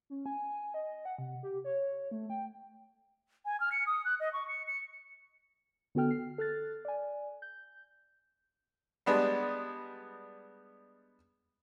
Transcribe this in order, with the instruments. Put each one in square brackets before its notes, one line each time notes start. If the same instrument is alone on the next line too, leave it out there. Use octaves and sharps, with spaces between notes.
[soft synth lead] C#4
G#5
D#5
F#5
C3
G4
C#5
A3
G5
[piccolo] G#5
F6
C#7
D#6
F#6
D#5
C#6
C#7
C#7
[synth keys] D3 B3 F#4 A4 G5 F6
C7
A4 F6 F#6 A6
D5 G#5
G6
[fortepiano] G3 G#3 B3 D4